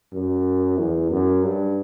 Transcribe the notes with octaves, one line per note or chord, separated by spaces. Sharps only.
F#2
E2
F#2
G2